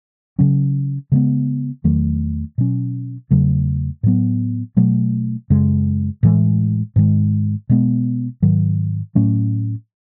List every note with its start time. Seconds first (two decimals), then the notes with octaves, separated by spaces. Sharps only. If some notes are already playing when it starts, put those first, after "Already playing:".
0.39 C#3 F#3 C#4
1.12 C#3 G#3 B3
1.84 E2 D#3 F#3 A3
2.58 B2 F#3 C#4
3.31 E2 C#3 F#3 A3
4.03 A2 F#3 B3
4.77 B2 F#3 A3
5.50 F#2 C#3 G#3
6.23 A2 E3 G#3
6.96 G#2 D#3 G#3
7.69 B2 G#3 B3
8.42 G#2 D#3 F#3
9.15 A2 F#3 A3 C#4